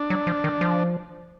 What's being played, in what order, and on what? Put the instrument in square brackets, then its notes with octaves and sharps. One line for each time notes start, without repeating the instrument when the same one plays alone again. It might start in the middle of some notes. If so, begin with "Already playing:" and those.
Already playing: [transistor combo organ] D4
[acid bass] F#3
F3
D#3
F3